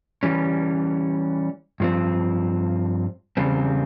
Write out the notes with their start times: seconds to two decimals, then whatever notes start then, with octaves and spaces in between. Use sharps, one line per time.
0.23 E3 G3 C#4
1.80 G2 F3 C4
3.37 E2 C#3 G3 C4